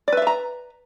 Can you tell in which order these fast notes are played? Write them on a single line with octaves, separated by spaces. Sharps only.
D5 B4 E5 F5 A#5